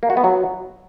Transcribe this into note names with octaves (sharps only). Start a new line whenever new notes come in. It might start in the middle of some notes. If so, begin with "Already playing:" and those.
A#3
F#4
B3
F#3